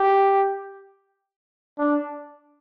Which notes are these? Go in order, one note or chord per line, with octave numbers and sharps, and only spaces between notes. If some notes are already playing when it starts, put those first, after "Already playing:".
Already playing: G4
D4